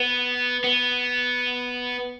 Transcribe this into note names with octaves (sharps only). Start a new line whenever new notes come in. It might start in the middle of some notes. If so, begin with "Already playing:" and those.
Already playing: B3
B3